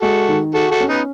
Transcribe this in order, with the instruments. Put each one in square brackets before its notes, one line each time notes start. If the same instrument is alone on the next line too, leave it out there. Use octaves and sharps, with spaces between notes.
[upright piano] G#3 [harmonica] F#4 A4
[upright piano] D#3
[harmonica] F#4 A4 [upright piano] G#4
[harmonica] F#4 A4
[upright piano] C#4
[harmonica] B3 D#4